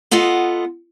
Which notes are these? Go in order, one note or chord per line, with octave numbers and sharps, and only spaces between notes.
B3 F4 A4 D#5 F#5